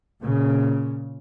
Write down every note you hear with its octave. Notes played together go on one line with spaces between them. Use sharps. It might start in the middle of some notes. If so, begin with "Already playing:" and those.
A#2 C#3